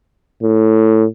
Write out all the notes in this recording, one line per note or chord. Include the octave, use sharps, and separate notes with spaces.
A2